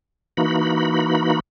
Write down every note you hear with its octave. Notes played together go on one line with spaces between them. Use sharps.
E3 A#3 D#4 F#4 B5